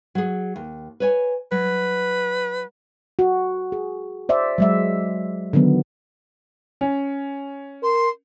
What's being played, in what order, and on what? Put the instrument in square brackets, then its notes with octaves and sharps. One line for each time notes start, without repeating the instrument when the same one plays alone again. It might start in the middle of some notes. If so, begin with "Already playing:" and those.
[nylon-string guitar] F#3 G#4
D#2
B4 C#5 G#5
[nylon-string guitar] F#3 [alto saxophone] B4
[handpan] F#4
G#4
C5 D5 E5
F#3 G#3 E5
D3 D#3 F#3 B3
[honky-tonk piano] C#4
[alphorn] A#4 [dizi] C6